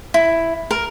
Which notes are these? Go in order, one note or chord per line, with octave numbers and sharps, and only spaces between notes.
E4
A#4